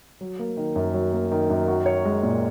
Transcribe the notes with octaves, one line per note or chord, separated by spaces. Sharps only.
F#3
A#3
D#3
F#2
F#3
A#3
D#3
F#2
F#4
C#5
G#3
A#2